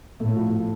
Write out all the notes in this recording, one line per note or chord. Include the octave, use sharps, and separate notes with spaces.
A2 A3
F3